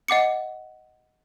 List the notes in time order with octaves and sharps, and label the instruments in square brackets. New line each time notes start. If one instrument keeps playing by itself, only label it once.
[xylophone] D#5 F#5 D6 C#7